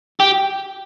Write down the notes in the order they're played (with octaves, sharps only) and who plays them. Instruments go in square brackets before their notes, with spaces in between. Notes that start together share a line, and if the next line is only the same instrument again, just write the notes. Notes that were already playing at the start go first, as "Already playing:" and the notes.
[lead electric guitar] G4